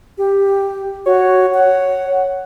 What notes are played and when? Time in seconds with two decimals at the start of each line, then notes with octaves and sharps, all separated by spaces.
0.18 G4
1.06 F#4 C#5
1.54 F#5